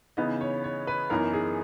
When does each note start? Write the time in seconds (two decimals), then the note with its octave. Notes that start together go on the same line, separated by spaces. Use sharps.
0.17 C#3 E3 B3 D#4 D#5
0.41 C#5
0.64 C#5
0.87 B4
1.10 F#2 E3 B3 D#4 A#4
1.33 G#4